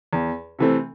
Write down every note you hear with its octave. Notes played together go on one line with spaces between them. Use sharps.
E2
C3 E3 A3 C4